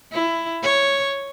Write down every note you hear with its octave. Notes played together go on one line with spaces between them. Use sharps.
E4
C#5